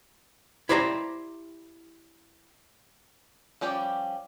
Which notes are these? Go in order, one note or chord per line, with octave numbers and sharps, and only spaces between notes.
E4 G4 C5 D5 G#5 A#5
F3 G3 C#4 G4 D5